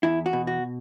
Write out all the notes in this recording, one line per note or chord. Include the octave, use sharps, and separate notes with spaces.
E2 E4
F#4
B2
F#4